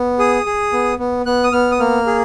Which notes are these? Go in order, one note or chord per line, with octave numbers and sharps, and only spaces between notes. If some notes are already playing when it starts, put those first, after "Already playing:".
Already playing: B3
G#4 D#6
G#4
B3
B3
B3 F#6
D#6
B3 F6
D#6
A#3 F6
G#4